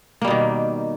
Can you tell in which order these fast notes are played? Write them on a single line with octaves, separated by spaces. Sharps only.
A#3 G3 B2 D#3